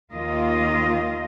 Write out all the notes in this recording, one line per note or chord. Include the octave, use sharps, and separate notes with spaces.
D#2 D#3 A#3 F4 D#5